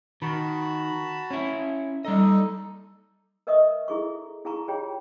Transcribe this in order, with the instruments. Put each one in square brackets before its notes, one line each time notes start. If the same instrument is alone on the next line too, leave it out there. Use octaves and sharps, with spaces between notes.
[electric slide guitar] D#3 [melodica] F#4 A5 B5
[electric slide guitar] C#4 E4
[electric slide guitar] G3 D#5 [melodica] D#4 A4
[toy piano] A#4 B4 D#5 E5 C#6 D#6
E4 G#4 A4 C#6
E4 G#4 F5 A5 A#5 C#6
F4 G4 G#4 C#5 G5